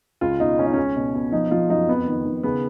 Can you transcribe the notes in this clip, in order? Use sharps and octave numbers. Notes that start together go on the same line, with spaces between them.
C#2 F4
B2 D#4
C#2 C#4
D#4
C#2 C#4
B2
B2
F3 D#4
F3 F4
F#2 D#4
F2 B3
D#3
D#3
C#3 B3